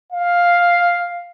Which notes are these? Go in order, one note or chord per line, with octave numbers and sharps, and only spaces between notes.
F5